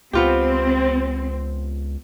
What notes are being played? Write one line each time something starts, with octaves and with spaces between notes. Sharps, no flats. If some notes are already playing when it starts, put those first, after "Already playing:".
C#2 B3 C4 F4 G4